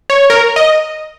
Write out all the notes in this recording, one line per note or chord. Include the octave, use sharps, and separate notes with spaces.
C#5
A#4
D#5